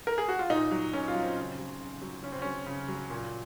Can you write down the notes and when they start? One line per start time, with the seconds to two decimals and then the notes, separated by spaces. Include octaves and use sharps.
0.07 A#4
0.18 G#4
0.29 F#4
0.39 F4
0.50 A#2 D#4
0.71 F#3
0.93 A#2 C#4
1.08 F4
1.15 F#3
1.22 C4
1.37 C#3
1.59 F#3
1.80 C#3
2.02 F#3
2.23 C#3 C#4
2.32 C4
2.42 F#3 C#4
2.66 C#3
2.88 F#3
3.10 A#2